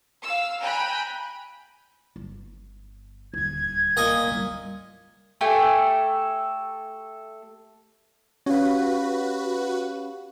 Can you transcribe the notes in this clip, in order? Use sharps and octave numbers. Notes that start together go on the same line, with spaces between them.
F5 E6
G5 G#5 A#5 B5 F#6
G1
D#1 D2 G#6
A#2 D#5 G#5
G#1 G3
A3 G4 A4 G#5
C#4 F#4 G4 B4 C#5 F5